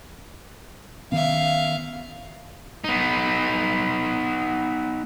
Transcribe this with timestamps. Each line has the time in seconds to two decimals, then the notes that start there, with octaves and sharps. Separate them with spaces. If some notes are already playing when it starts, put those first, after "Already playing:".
1.12 D#3 B3 C#4 E5 F5
2.84 B3 D#4